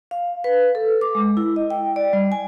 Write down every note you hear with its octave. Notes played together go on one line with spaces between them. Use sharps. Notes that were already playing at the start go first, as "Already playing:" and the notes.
F5
B4
A4
D6
G#3
E4
D#5
G5
D5
G3
G#5